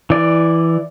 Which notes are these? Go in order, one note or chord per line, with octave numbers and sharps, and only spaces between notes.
E3 D5